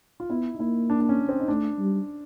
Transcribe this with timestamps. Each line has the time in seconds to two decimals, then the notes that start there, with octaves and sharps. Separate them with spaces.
0.20 F4
0.30 B3 E4
0.54 D#4
0.60 A#3 E4
0.90 D4
1.01 D4
1.09 C#4
1.29 C4
1.40 D#4
1.48 A3 D4
1.79 G3